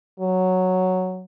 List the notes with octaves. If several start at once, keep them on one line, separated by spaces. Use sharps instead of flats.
F#3